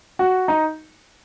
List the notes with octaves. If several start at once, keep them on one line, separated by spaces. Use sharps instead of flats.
F#4
D#4